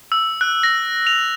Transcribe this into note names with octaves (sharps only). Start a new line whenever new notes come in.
E6
F#6
A#6
F7